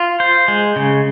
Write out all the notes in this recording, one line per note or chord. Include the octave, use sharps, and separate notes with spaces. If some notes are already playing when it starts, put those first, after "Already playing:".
Already playing: F4
C5
G#3
C#3